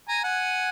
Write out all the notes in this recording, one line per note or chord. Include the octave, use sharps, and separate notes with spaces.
G#5 A#5
F#5 G#5